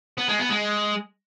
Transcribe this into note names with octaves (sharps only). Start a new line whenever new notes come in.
B3
G#3
B3
G#3